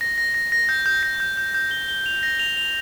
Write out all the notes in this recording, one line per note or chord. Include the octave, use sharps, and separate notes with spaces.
A#6
A#6
A#6
A#6
G6
G6
A#6
G6
G6
G6
G7
G7
F7
A#6
F7
F7